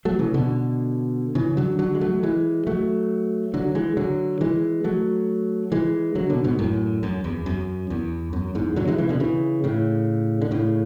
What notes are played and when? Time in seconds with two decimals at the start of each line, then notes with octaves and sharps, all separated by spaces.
0.05 F#3 A3
0.19 C#3 E3
0.34 B2 D3
1.35 C#3 E3
1.57 D3 F#3
1.79 D3 F#3
1.95 G#3
2.01 F#3 A3
2.23 E3 G#3
2.67 F#3 A3
3.54 D3 F#3
3.75 E3 G#3
3.97 D3 F#3
4.41 E3 G#3
4.84 F#3 A3
5.72 E3 G#3
6.15 D3 F#3
6.30 B2 D3
6.44 G#2 B2
6.59 F#2 A2
7.03 F#2
7.24 E2
7.46 F#2
7.90 E2
8.33 F#2
8.55 E2 G#2
8.76 D3 F#3
8.88 E3 G#3
8.98 C#3 E3
9.09 B2 D3
9.20 C#3 E3
9.64 A2 C#3
10.42 D3
10.51 A2 C#3